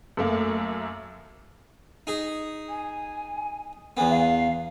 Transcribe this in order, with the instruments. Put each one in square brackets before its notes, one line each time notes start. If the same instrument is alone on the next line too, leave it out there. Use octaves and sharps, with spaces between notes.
[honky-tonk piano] F#2 A3 A#3
[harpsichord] D#4 G#4
[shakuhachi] G#5
[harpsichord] E2 B3 [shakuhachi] G#5
[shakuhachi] F5